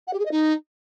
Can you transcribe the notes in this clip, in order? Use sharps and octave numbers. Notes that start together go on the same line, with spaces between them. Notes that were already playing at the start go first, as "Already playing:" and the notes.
F#5
G4
G#4
D#5
D#4